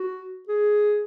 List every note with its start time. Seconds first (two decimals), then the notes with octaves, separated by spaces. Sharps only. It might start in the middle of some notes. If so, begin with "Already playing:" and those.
Already playing: F#4
0.48 G#4